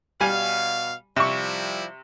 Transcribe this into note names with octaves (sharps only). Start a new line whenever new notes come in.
B2 G3 F5 G#5
C3 F3 G3 E4 C#6